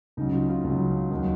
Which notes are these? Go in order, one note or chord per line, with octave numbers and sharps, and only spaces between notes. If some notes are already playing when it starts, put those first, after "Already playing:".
C#2 C#3 F#3 D#4
F4
F4
C#2 C#3 F#3
D#2 D#3 F#3